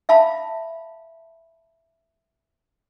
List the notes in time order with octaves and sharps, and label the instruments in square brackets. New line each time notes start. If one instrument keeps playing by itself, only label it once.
[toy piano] E5 F5 A5 B5